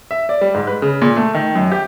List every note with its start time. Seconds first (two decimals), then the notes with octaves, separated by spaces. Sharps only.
0.11 E5
0.29 D5
0.41 G3
0.54 G#2
0.67 B4
0.82 C#3
1.02 A#2
1.16 A3
1.34 D#3
1.55 F#2
1.71 G4